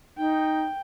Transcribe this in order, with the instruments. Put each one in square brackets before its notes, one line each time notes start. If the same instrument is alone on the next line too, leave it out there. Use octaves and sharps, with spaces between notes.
[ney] D#4 [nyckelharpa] G5